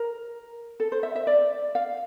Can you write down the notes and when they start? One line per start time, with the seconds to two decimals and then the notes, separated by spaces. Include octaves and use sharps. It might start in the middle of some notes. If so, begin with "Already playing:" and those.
Already playing: A#4
0.80 A4
0.92 C5
1.03 E5
1.16 E5
1.27 D5
1.75 F5